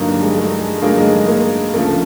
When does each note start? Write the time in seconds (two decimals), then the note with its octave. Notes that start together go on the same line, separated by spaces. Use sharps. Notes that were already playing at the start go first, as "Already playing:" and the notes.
Already playing: G2 D3 F#3 A#3 D#4
0.09 G3
0.22 G#3
0.36 A3
0.59 G#3
0.82 G2 D3 F#3 G#3 A#3 D#4
1.00 G#3
1.05 A3
1.28 A#3
1.74 D2 C#3 F3 A3 A#3